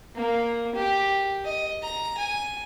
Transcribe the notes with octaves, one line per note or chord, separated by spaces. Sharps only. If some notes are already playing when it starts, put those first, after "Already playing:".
A#3
G4
D#5
A#5
G#5